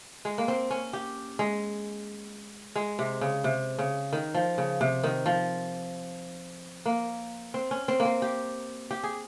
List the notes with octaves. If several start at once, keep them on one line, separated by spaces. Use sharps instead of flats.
G#3
A#3
C4
C#4
G4
G#3
G#3
C3
C#3
C3
C#3
D#3
F3
C#3
C3
D#3
F3
A#3
C4
C#4
C4
A#3
C4
G4
G4
G#4